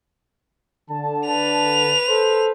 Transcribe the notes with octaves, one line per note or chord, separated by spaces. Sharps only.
D3 A5
B4 F7
A4 C5